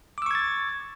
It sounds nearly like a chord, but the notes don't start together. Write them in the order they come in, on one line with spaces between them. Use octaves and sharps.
D6 E6 C#6 G#6 A6